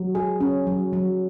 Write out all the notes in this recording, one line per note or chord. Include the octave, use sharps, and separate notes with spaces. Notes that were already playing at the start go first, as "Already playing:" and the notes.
Already playing: F#3
G#4
C#4
F#3
F#3